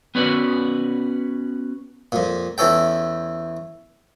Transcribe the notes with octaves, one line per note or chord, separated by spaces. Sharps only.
B3 C#4 F#4 B4 D5
F2 A#2
E2 E3 C#4 A4 G5